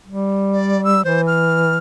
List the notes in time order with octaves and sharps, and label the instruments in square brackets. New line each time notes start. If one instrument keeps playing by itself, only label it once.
[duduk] G3
[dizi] D5
E6
[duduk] E3 [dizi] C5
[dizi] F6